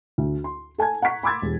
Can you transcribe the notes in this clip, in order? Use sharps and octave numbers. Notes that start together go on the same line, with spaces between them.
D2
C6
A4 G#5 A5 G#6
F#5 A#5 C#6 B6
B5 C6 D6 E6 G#6 A6
E1 G4